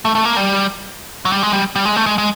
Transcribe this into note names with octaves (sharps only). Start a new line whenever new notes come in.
A3
A3
A#3
G3
F#3
G3
G#3
G3
G3
G#3
A3
G#3
G#3